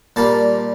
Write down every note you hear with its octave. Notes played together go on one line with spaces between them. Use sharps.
A#2 G3 A#3 A5